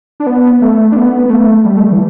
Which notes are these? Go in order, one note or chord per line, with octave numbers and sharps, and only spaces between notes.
D4
B3
A3
D4
B3
B3
A3
G3
A3
G3
E3